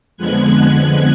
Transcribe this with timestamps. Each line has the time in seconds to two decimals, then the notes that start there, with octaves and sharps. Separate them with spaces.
0.17 F2 D3 F3 G#3 B3 F#6 G#6